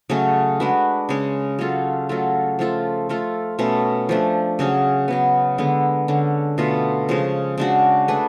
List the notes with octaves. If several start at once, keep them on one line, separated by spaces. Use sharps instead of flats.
C#3 F#3 A3 C#4
G#3 D4 F#4 B4
C#3 G#3 C#4
F#3 C#4 F4 A4
F#3 A3 F4 A4
F3 A3 F4 A4
A3 F4 A4
B2 A3 C#4
F3 A3 D4
C#3 F#3 C#4 G#4
C#3 F#3 B3
D3 G#3 B3
D3 G#3 C#4
B2 A3 F4
C#3 F3 G#3
C#3 G#3 D4 F#4
A3 D4 G#4 B4